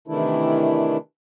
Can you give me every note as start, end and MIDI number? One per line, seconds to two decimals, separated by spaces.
0.08 0.97 48
0.08 0.97 51
0.08 0.97 52
0.08 0.97 57
0.08 0.97 62
0.08 0.97 64